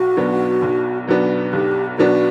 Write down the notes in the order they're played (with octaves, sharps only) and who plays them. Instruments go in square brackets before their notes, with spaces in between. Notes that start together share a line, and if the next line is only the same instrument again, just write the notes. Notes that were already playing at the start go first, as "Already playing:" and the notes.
Already playing: [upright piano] B1 [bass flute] F#4
[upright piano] B2 F#3 B3 D4
B1
B2 F#3 B3 D4
[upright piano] B1 [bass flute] G4
[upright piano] B2 F#3 B3 D4 [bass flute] F#4